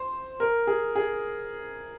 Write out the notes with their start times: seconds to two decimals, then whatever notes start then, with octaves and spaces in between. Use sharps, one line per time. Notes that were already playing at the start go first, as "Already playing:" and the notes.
Already playing: C5
0.40 A#4
0.67 G#4
0.95 G#4